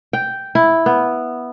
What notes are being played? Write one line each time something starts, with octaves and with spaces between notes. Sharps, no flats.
G5
E4
B3